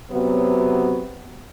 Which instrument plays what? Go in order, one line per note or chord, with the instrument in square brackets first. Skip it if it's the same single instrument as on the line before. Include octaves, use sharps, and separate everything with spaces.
[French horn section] C3 F#3 B3